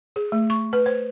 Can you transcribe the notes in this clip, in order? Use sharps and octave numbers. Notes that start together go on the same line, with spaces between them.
G#4
A3
C#6
B4
C5